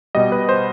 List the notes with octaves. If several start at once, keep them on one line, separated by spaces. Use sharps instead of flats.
B2 G3 D#5
B4
C5